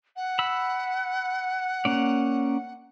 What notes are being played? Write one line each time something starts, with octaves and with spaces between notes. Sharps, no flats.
F#5
B5 E6
A#3 C#4 D5